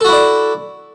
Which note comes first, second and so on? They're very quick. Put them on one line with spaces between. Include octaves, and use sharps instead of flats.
A4 F#4 E4 D5